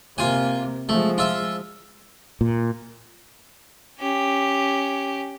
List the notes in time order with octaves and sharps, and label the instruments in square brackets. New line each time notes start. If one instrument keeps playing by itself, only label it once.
[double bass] C3 A#3 [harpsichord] F4 G#5
[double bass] F3 G#3 [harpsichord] A3
[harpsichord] F4 E5
[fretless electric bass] A#2
[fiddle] C#4 G4